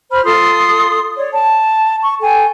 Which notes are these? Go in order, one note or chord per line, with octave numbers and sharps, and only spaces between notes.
C5 B5 F6
F4 A4 C6 D#6
C#5 D5
A5
C#6
A4 G5 G#5